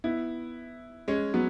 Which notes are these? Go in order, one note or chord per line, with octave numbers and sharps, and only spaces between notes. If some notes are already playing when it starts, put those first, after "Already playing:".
B3 E4
G#3 C#4
F#3 B3